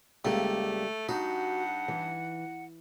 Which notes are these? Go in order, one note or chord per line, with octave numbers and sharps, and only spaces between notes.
C#2 G3 A3 A#3 G4
G2 D#4 F#4 F#5
E3